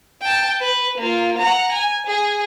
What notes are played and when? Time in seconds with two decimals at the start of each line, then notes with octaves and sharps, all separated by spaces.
0.21 G5 A5
0.60 B4
0.98 A#3 F4
1.38 F#5 A#5
1.72 G#5
2.07 G#4